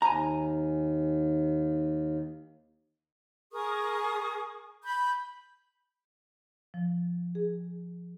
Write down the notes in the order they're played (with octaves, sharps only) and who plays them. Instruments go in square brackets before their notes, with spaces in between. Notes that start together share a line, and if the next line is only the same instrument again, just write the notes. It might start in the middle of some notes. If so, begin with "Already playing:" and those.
[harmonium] D#2 [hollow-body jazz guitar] G#5 A#5
[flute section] G#4 A#4 C#6 D#6
B5 G6
[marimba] F3
G#4